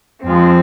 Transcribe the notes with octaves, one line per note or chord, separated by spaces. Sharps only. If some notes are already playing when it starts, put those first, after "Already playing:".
F2 F3 G#3 C4